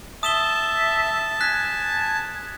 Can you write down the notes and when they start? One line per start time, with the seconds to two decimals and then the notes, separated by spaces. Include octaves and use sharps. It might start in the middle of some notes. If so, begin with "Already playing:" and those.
0.23 E5 A5 D#6 E7 G7
1.41 G#5 F#6 B6